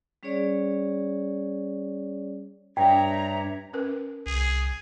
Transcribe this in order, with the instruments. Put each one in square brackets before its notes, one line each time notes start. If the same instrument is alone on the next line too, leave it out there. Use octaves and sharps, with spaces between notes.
[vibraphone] G3 C#4 G#4 C#5 D5
[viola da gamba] G2 [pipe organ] C#5 E5 [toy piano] G5 [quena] A#5
[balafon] C#4 A#4 B4
[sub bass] C2 [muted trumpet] G#4